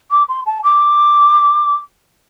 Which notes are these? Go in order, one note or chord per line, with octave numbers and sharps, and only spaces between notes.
D6
C6
A5
D6